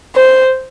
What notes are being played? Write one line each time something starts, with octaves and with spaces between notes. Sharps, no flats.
C5